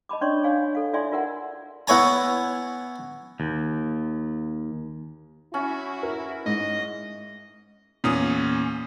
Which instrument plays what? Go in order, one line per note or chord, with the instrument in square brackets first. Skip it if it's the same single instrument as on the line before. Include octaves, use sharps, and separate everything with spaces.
[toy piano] D#5 A5 B5 D6
C#4 D4 C#5 D5 C6 C#6
D4 C#5 F5 G#5
A4 F5
E4 F4 D5 E5 G#5 C6
F4 F#4 A#4 E5 F#5
[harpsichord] B3 E4 C#5 G#5 A#5
[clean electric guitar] D#2
[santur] C#4 [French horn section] E4 [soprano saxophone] F#4
[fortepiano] A#4
[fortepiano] G#2 [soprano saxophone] D#5
[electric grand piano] E2 C#4 D#6 [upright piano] A#2